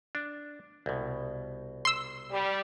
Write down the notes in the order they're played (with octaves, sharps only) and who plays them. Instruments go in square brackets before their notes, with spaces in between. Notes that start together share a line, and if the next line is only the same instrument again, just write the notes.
[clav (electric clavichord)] D4
C2 B2
[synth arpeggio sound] C6 E6
[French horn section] G3